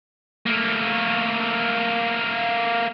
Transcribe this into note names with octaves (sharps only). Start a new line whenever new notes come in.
A3 A#3